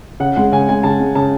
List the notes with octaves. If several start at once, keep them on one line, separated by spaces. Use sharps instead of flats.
C#3 F#5
G#3 F#5
C#3 G#5
G#3 G#5
C#3 A5
G#3
C#3 A5